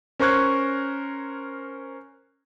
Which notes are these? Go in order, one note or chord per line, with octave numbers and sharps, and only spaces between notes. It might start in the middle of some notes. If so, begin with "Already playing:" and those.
C#4 A#4 C5 C#6 F#6 G#6